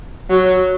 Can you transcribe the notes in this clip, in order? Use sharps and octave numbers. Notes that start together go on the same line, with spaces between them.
F#3